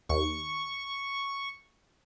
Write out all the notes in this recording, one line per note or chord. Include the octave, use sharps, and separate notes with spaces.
D#2 C#6